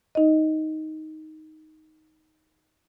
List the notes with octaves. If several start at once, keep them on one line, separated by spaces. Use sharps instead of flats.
D#4 D#5